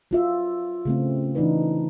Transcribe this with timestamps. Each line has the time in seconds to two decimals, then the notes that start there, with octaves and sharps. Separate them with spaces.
0.11 F#3 F4 E5
0.85 C#3 A3 C4
1.35 E3 D4 D#4 B4